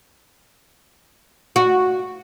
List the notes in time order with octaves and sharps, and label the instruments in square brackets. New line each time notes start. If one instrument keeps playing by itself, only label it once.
[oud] F#4